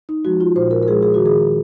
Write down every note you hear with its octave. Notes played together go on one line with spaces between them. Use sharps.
D#4
F3 G#3 F#4
F4
A#2 C5
A#4
A#4
F3 G#3 G#4
G#4
D#3 F#4
G#4